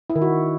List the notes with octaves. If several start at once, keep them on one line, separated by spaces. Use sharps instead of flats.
E4
D#3
F#4